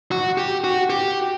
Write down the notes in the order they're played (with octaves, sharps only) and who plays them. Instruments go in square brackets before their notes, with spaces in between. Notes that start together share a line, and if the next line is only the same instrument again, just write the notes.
[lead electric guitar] F#4
G4
F#4
G4